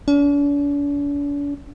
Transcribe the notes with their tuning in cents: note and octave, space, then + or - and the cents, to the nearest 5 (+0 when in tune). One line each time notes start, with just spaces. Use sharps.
D4 -45